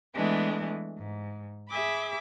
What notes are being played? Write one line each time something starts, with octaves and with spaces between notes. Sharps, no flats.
E3 G#3 A3 B3 D4
G#2
G#4 E5 B5 D6